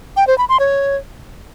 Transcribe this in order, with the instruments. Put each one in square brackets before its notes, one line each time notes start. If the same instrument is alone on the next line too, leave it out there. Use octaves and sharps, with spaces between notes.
[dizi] G5
C5
B5
C6
C#5